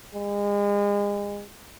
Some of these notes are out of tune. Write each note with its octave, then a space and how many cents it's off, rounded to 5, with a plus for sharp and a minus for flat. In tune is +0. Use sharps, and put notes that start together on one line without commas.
G#3 -35